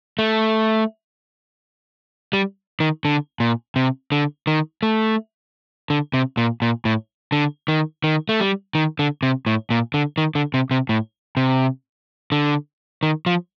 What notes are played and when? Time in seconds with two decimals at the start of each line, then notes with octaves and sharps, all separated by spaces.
0.19 A3
2.33 G3
2.80 D#3
3.05 D3
3.40 A#2
3.76 C3
4.12 D3
4.47 D#3
4.83 A3
5.90 D3
6.13 C3
6.37 A#2
6.62 A#2
6.85 A2
7.32 D3
7.68 D#3
8.04 D#3
8.29 A3
8.40 G3
8.75 D#3
8.99 D3
9.23 C3
9.46 A2
9.70 A#2
9.94 D3
10.18 D#3
10.35 D3
10.54 C3
10.71 C3
10.89 A2
11.37 C3
12.32 D3
13.03 D#3
13.26 F3